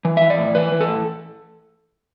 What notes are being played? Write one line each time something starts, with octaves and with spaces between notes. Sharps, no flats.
E3
E3 E5
D5
A2
E3 B4
E3
A4
A2